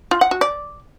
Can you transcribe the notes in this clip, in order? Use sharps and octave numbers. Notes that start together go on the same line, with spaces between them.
F4
F#5
F#4
D5